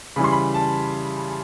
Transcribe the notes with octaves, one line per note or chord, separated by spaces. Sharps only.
C#3 E3 G3 B5
C6
B5
A5